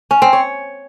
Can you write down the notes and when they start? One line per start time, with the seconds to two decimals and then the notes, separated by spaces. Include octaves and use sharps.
0.11 C#4
0.22 C4
0.33 C#5